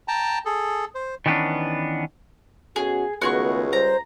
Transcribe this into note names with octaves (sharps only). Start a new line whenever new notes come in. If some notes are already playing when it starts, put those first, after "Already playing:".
G5 A5 A#5
G#4 A4
C5
D#3 E3 G3 B3 C#4 D4
B2 C#4 F#4 G#4
C#2 D#3 A3 B3 F#4 G#4 C#6
G3 C5 A#5